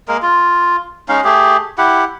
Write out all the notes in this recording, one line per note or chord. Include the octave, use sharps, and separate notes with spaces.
G#3 A#3 A#4
F4
G#3 C#4 D#4 F5
A3 G4 G#4
E4 G4 F#5